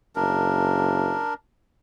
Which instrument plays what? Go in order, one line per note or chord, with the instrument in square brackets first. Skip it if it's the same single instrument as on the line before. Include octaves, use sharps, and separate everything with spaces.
[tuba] F#1 [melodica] D4 A#4